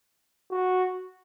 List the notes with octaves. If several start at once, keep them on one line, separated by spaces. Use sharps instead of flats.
F#4